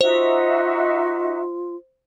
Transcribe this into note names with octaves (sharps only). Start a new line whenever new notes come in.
D#4 F4 F#4 C5 E5